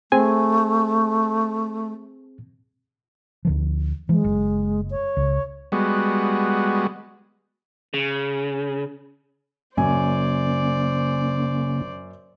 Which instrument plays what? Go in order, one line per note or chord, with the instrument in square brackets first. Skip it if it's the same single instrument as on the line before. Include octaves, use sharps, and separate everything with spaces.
[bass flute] A3 [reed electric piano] C4 G#4 G#5
[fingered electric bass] D2 D3 F3
[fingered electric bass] E3 F3 [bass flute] G#3
[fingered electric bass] F#1
[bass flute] C#5
[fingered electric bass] C#2
[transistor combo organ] G3 G#3 B3 F#4
[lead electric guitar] C#3
[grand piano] F#2 G#5 [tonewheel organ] C#3 A#3 C#4 [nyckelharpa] C5 D5